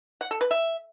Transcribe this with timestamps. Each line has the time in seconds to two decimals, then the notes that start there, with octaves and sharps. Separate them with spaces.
0.21 F#5
0.31 A4
0.41 B4
0.51 E5